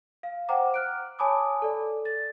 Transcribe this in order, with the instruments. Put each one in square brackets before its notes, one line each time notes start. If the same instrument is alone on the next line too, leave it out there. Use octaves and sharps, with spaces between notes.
[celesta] F5
C5 F#5 G5 A#5 D6
F6 F#6 D7
C#5 G#5 A5 B5 D6 D#6
A4 D5
A6